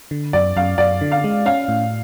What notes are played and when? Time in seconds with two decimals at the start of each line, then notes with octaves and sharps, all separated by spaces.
0.11 D3
0.33 F#2 D5
0.56 F#2 F5
0.78 F#2 D5
1.01 D3
1.12 F5
1.24 G#3
1.46 C#4 F5
1.68 A2